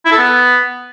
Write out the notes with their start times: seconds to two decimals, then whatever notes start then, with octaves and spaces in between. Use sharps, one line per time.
0.06 E4
0.11 A4
0.17 B3